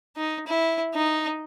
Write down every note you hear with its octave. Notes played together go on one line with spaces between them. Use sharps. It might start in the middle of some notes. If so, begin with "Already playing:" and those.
D#4
E4
D#4